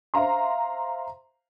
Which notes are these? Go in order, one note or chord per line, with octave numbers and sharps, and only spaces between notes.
C5 E5 F5 A#5 C6